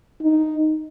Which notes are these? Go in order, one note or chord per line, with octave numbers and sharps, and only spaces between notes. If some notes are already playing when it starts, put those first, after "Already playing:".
D#4